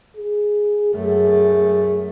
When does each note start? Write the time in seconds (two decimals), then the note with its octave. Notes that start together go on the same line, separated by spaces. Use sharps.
0.17 G#4
0.95 F#2 A3 G#4